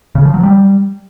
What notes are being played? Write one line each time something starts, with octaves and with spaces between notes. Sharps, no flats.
C#3
F3
F#3
G3